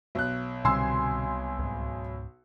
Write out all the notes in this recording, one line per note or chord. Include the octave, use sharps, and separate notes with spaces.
B1 F#6
C2 B2 D3 C4 G#5 C6 E6
C#2 G#2